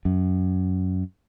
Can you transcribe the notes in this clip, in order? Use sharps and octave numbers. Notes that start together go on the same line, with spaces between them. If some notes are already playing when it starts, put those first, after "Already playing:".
F#2